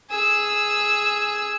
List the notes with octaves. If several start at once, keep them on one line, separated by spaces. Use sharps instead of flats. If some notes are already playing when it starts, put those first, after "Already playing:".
G#4 E6